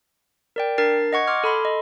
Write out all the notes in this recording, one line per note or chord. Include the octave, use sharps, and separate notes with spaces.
A#4 D5 G5
D4 A#4 A6 C7
D#5 F#5 C#6 G#6
C6 D6 F6 G#6
A4 B5 C6
D#5